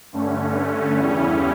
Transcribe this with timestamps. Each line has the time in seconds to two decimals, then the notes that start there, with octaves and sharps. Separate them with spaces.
0.13 G2 D3 A3 C#4
0.98 E2 C#3 G3 C#4 E4